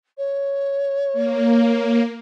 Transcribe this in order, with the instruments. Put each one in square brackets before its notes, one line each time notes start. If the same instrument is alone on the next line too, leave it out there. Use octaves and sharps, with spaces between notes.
[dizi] C#5
[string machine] A#3